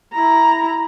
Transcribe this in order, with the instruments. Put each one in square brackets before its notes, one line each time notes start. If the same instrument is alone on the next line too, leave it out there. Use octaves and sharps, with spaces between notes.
[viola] E4 A#5